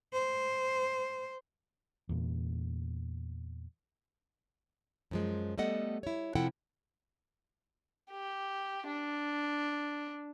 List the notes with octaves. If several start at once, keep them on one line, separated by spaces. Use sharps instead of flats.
C5
E2 A#2
F#2 F3 G#3
G3 A3 B3 A4 D#5 F#5
E4 C#5
C3 F3 E4 A4 F#5 G5
G4
D4